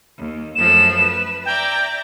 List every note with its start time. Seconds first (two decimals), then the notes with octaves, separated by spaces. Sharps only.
0.18 D#2
0.55 F#2 F3 A3 E7
0.96 B4
1.45 D5 E5 G5 A#5